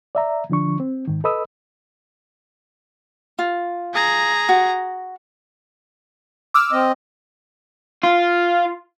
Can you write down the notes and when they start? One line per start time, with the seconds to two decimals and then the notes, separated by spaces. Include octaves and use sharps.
0.15 D5 E5 A#5
0.50 D3 F3 D4 C#6
0.80 C4
1.08 G#2 D#3
1.24 A4 B4 D#5 B5 D#6 E6
3.39 F4
3.94 G#4 A#5
4.49 F#4
6.54 D6 E6 F6
6.72 C4 D#5
8.03 F4